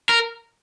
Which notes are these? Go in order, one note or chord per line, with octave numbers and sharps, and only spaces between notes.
A#4